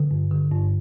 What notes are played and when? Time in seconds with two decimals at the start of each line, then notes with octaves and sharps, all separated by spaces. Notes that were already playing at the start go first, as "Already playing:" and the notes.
Already playing: D3
0.11 G2
0.31 D3
0.51 G2